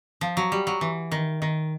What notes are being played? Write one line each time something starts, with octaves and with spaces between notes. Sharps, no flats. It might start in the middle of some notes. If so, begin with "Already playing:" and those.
F3
F#3
G3
F#3
E3
D#3
D#3